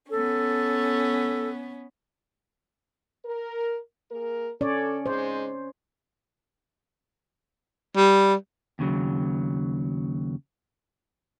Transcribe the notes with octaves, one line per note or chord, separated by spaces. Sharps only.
B3 C#4 A4
A#4
A#3 G#4 A#4
C#4 A4 C#5 D5
G#2 G#3 C5
G3
D#2 C#3 F3 F#3